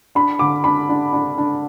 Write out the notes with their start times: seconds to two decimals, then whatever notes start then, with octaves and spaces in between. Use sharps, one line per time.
0.15 D4 B5
0.39 D3 D6
0.64 D4 B5
0.89 D4
1.13 D4
1.38 D4